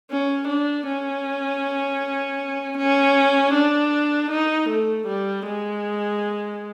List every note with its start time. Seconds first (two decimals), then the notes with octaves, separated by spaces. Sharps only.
0.11 C#4
0.48 D4
0.86 C#4
2.78 C#4
3.54 D4
4.31 D#4
4.69 A3
5.07 G3
5.46 G#3